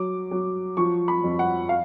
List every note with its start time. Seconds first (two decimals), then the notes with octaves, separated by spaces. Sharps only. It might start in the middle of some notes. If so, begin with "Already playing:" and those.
Already playing: F#3 D6
0.31 F#3
0.77 F3 C#6
1.08 B5
1.24 F2
1.39 F#5
1.69 F5